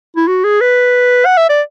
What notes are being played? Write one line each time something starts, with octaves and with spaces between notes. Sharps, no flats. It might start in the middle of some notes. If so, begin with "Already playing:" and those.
E4
F#4
G#4
B4
F#5
E5
D5